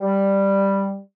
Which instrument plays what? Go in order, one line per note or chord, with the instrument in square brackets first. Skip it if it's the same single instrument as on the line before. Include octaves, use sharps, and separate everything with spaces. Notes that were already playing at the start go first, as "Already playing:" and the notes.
[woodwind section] G3